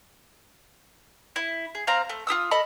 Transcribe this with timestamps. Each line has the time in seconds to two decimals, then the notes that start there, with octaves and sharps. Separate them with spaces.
1.36 E4
1.75 G#4
1.87 C4 F5 A#5
2.09 A3
2.27 F4 G4 D#6 E6
2.51 A4 D#5 B5